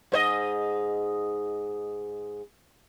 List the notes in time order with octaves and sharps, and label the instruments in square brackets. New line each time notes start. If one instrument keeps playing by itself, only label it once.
[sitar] G#2 C5 D#5